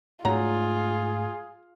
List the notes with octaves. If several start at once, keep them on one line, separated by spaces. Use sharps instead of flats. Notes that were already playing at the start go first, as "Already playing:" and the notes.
G#2 F#3 A3 D4 F4 G#4 A#5